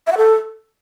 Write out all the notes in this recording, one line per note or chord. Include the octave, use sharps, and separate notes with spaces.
E5
F#5
A4